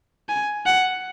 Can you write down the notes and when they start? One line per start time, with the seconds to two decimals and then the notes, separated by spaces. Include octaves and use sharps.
0.29 G#5
0.66 F#5